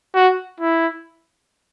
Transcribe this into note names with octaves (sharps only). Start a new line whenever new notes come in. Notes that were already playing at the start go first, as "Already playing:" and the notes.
F#4
E4